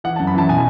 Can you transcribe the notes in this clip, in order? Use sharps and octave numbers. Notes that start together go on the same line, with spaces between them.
E3 F#5
A5
F#2
B5
E3 A5
B2 G#5